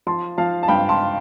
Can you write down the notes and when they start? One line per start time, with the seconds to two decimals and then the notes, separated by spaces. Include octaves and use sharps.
0.07 F3 A5 C6
0.38 F3 F5 A5
0.63 A5
0.68 G2 G5 B5
0.89 A5 C6